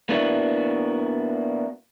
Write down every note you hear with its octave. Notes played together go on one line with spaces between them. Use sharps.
A#3 B3 D4 E4 F#4